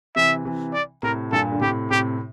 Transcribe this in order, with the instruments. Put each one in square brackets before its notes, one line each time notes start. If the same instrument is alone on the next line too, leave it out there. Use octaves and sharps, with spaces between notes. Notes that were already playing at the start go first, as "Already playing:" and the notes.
[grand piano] C3 E3 [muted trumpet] E5
[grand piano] C3 E3
[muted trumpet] D5
[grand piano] A2 C3 [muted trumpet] A#4
[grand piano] G2 A#2 [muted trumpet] A4
[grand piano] D3
[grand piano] A2 C3 [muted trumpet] G4
[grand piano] A2 C3 [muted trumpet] G4